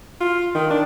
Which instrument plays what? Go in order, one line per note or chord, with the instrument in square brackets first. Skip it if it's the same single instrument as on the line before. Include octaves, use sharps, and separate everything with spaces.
[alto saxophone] F4
D#3
D4